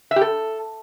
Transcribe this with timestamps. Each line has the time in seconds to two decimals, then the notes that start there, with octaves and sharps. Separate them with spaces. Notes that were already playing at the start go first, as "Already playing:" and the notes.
0.11 E5
0.16 G4
0.21 A4